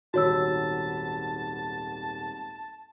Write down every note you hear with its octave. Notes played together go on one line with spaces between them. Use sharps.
D#1 G#1 F#4 C#5 A5 B5 E6